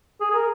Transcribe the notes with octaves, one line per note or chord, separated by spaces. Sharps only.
G#4
G#4
A#4